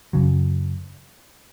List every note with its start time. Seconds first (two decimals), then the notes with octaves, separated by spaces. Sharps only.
0.13 F#2 C#3 F#3